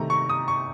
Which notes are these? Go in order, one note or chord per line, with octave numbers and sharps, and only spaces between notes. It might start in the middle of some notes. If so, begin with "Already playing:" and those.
Already playing: C3 D#3 A3 A#5
C#6
D#6
C#6